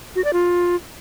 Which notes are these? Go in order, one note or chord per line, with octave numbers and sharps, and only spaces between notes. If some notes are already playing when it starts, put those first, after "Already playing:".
F#4
D5
F4